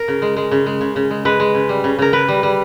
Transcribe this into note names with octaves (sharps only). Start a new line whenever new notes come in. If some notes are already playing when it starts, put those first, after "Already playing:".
Already playing: A#4
C#3
G#3
G#3
C#3
G#3
C#3
C#3
G#3
G#3 B4
G#3
C#3
G3
C#3
C#3 A#4
C#3 B4
G3
G3